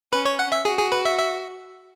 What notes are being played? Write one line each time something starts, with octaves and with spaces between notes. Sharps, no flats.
C#4 B4 B5
C#5 C#6
F#5 F#6
E5 E6
F#4 G#4 G#5
G#4 G#5
B4 B5
E5 E6
E5 E6